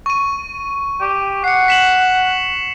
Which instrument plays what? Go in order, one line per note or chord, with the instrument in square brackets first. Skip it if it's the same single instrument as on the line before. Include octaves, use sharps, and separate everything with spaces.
[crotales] C#6 D#7
[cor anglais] G4
[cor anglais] F#5 [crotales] C7 C#7
[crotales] B6 E7 F#7